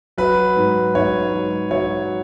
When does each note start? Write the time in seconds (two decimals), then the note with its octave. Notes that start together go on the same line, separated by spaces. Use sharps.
0.18 F#3 B4
0.57 G#2
0.95 G#2 C#5
1.34 F#3
1.71 F#3 C#5